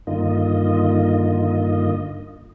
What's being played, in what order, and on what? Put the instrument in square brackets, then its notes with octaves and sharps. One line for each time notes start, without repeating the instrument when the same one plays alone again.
[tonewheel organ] G2 D3 D#3 A#3 F4 D#5